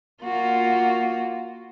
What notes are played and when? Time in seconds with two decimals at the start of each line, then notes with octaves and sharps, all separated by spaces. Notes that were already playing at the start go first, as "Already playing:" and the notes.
0.23 A#3 F4 F#4